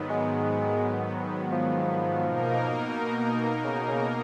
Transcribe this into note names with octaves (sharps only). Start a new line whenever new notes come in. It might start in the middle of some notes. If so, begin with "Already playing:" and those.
Already playing: G#2 D#3 F#3 B3
G#3
F3
B2 A#3 D#4 A#4
C#3
C#3